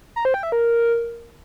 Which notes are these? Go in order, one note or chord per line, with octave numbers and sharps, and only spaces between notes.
A#5
C5
G5
E5
A#4